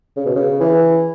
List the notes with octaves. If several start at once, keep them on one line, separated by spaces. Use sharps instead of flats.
C#3
B2
C#3
E3